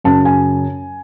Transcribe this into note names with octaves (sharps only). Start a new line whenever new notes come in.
F#2 C#3 A5
G#5